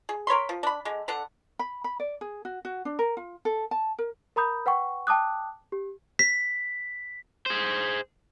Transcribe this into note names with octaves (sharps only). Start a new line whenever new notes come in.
G#4
A#4 C#5 B5 C6
F3
D4 B5
D3 G#3
D3 D4 A4 F#5
B5
B5
D5
G#4
F#4
F#4
D4
A#4
F4
A4
A5
A#4
A#4 A#5 B5 D#6 G6
B4 F#5 G5 C#6
G5 A5 D6 D#6 F#6
G4
B6
G#4 C5